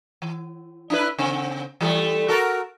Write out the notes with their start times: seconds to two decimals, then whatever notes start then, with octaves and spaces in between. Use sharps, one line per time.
0.22 E3
0.90 D4 E4 B4
1.19 C#3 C4
1.81 E3 G3 A3
2.28 F#4 A4 A#4